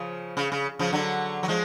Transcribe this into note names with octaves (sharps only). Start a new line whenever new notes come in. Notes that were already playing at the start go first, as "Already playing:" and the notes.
Already playing: C#3 F3
C#3
C#3
C#3 F3
D3 F#3
F#3
F3 G#3